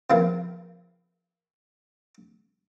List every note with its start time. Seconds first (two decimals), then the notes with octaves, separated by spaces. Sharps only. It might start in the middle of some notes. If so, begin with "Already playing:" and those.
0.10 C#3 E3 F3 A#3